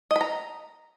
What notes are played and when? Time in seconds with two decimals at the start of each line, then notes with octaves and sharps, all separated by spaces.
0.11 D#5
0.16 B5
0.21 A#5